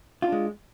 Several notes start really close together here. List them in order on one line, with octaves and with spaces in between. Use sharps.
F4 D4 G#3